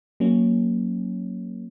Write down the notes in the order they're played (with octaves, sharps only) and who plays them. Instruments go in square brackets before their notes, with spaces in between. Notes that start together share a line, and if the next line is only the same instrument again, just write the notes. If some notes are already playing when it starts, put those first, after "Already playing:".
[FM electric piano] F#3 A#3 C#4